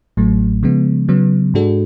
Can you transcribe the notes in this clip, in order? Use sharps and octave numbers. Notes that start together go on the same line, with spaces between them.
A1 A2 F#3 A3
C#3 F3 G#3 B3
C#3 F#3 B3
G#2 G#3 D4 F#4 A4